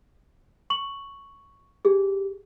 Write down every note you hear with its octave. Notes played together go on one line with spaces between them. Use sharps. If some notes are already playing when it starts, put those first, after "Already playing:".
C#6 F#7
G4 G#4